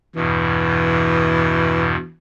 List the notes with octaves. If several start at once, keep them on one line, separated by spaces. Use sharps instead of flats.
E2 G2 B2 E3